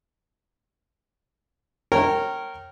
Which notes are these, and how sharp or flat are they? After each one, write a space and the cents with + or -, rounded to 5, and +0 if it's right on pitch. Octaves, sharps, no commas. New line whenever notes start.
A#4 -15 C#5 -25 G5 -25